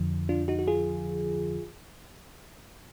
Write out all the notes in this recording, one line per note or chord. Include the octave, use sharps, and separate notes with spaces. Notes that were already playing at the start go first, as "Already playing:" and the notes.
Already playing: F2 D3 F3
D4 F4
D#4 F#4
F#4
F4 G#4